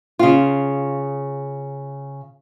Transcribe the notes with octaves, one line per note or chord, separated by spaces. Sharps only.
C#3 F4